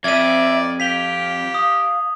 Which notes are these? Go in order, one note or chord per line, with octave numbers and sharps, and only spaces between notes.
F2 D5 E5 G#6 D#7
G4 F5 B6 F7 G7
D#6